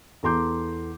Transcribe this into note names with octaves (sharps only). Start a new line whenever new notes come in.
E2 A4 A#5 C6 D6 G6